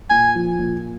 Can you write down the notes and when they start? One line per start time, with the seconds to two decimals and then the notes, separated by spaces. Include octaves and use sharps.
0.10 A#2 G#5
0.35 F3
0.59 A#2